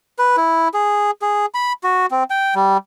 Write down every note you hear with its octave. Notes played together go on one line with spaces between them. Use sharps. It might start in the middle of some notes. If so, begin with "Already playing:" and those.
B4
E4
G#4
G#4
B5
F#4
C4
G5
G3